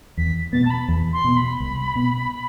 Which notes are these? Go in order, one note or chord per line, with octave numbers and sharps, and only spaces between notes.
E2 B6
B2 B3 A6
A5
B5
E2
C6
B2 B3
B5
C2
B2 B3